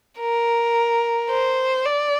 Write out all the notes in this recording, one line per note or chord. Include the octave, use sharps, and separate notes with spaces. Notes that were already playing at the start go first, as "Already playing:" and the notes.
A#4
C5
D5